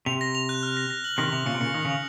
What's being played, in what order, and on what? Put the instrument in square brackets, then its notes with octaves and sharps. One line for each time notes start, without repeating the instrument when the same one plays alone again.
[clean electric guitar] C3 [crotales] F7
[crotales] A#6
F7
F#6
F6
A#6
A#6
F#7
[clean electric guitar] C3 D#3 [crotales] A#6
[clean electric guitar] C3 [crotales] F7
[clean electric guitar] A#2 C#3 [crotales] C#7
[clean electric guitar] C3
[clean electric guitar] A#2 C#3 [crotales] C#7
[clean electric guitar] D#3 [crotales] D#6
[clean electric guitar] C#3 [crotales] F7